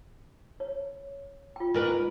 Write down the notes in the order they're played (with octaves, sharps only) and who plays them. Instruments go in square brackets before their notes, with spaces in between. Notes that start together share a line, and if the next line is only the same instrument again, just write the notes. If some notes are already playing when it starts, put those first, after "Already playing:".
[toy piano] C#5
F4 G5
[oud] G#2 A#4 B4